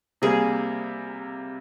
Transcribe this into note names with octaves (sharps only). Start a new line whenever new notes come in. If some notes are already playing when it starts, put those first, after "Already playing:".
C3 G3 A#3 G#4